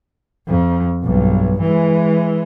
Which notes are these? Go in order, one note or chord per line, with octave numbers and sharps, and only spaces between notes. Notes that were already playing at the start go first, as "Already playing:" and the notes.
F2
B1 G2
E3 G#3